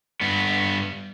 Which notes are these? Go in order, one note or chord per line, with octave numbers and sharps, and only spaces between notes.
G2 B3